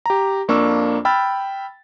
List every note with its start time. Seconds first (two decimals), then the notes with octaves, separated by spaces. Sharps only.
0.06 G4 A#5
0.48 F2 A#3 D4 C#6 E6
1.05 G5 B5 E6 F6 A6